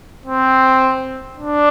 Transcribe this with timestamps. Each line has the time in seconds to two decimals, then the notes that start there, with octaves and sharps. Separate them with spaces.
0.26 C4
1.38 D4